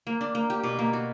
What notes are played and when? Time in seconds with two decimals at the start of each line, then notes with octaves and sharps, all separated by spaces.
0.07 A#3
0.21 D4
0.35 A#3
0.50 G4
0.63 B2
0.79 A#3
0.93 F#4